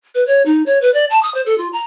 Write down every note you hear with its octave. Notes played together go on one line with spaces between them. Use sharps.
B4
C#5
D#4
C#5
B4
D5
A5
D#6
C5
A4
F4
A#5